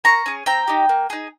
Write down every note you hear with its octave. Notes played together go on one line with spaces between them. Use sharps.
A#3 A#5 C#6
C#4 G#4
C4 G5 A#5
D#4 G4
A#3
D#4 G#4